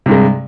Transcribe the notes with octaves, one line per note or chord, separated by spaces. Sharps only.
G2 C3 G#3